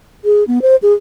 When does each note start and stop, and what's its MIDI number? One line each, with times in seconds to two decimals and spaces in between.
0.25 0.44 68
0.47 0.62 59
0.62 0.76 72
0.83 0.93 68